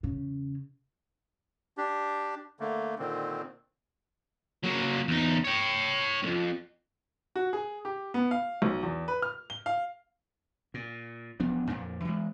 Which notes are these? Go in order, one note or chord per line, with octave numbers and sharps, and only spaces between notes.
E2 C#3
D4 G4
D3 A3 A#3
A#2 D3 D#3 C4
F#3 A#3
E2 D#4
C#5 G5
C2 F2
F#4
G#4
G4
B3
F5
B1
E2
B4
F6
G7
F5
A#2
E1 F3 B3 D4
F2 A#2 D4
E3 G#3